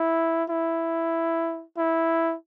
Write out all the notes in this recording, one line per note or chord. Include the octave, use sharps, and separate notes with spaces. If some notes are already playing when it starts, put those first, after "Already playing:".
Already playing: E4
E4
E4